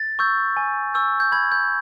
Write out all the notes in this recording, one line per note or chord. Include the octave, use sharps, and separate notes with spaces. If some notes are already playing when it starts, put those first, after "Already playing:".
Already playing: A6
C#6 E6 G6
G#5
C#6 E6 G6
G6
B5 G#6
G6